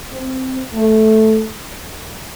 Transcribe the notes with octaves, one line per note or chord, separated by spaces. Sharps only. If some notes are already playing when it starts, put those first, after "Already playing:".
C4
A3